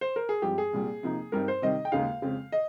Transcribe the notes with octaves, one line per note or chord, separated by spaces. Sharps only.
C5
A#4
G#4
G2 F3 G#3 C4 G4
G#4
C2 A#2 G3
C3 F3 A#3 D#4
G2 G3 C4 D#4 A#4
C5
C3 D#3 G3 D#5
G5
D#2 C#3 G#3 D#4 F5
F2 C#3 G#3 C4
D#5